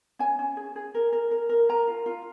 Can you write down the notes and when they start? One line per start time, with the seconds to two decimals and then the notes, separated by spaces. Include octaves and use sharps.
0.19 C#4 G#5
0.39 C#4
0.57 G#4
0.76 G#4
0.95 A#4
1.13 A#4
1.31 A#4
1.49 A#4
1.69 A#4 A#5
1.88 F4
2.06 F4